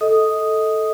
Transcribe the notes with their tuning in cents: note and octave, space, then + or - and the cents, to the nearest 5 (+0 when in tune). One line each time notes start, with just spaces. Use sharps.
A4 +0 D#5 +25 D#6 +0